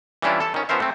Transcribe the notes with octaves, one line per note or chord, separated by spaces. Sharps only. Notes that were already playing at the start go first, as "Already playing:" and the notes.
E3 G3 C#4 D4 E4 F4
A4 A5
D#3 C#4
F3 B3 C#4 A#4 C5 E5
A3 C4